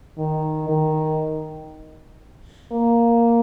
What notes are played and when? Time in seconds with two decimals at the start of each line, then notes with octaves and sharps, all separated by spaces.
0.18 D#3
0.69 D#3
2.72 A#3